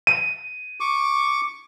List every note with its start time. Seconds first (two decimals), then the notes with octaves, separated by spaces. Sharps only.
0.07 D#7
0.80 C#6 D6